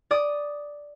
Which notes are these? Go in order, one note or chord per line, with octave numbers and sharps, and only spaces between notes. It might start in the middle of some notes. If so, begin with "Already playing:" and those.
D5 D#6